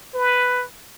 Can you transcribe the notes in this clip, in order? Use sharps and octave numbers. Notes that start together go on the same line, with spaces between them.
B4